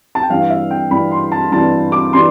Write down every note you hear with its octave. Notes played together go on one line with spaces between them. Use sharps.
A5
G5
G2 E3 G3 D4 F5
E5
G5
G2 E3 G3 D4 B5
C6
A5
G2 E3 G3 D4 A5
D6
E3 G3 D4 C6